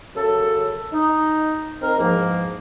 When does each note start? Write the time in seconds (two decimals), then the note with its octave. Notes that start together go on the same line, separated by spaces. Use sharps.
0.16 F#2 C#3 A4
0.93 D#4
1.82 C4 D#4 A#4
1.99 E2 G#2 F3 A#3